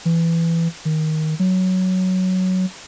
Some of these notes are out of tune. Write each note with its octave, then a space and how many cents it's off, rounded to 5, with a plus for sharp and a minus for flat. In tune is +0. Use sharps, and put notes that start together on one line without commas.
E3 +15
D#3 +10
F#3 +5